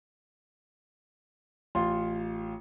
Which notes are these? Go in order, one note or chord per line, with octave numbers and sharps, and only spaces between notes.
A1 F4 C6